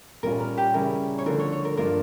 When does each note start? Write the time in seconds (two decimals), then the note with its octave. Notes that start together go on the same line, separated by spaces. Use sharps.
0.23 A#2 G3 C#4 F4 A#4
0.40 A#4
0.58 G4
0.74 C#3 G3 C#4 E4 A#4
1.18 C#5
1.26 D3 F3 A3 D4 A#4
1.39 C#5
1.52 C#5
1.65 A#4
1.77 G2 F3 A#3 D4 F4 A#4